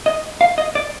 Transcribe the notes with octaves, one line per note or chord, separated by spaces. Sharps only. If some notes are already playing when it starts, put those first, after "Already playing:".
D#5
F5
D#5
D5